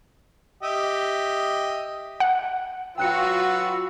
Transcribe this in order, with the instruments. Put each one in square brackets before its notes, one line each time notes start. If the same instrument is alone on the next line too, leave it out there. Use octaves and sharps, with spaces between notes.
[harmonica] G4 D#5 E5
[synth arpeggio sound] F#5
[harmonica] F#3 B4 E6 [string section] F4 F#4 [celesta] G5 F#6 C#7